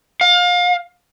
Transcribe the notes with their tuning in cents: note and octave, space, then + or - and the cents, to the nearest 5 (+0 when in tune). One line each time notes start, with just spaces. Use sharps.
F5 +30